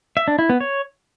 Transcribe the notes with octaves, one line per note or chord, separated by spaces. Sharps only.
E5
D4
E4
B3
C#5